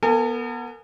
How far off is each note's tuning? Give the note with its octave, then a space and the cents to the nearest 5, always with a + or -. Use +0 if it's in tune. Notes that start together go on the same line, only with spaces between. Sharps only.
B3 -20 A4 +45 G#5 +0